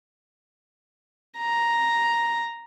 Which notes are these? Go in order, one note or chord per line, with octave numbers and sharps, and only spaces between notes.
A#5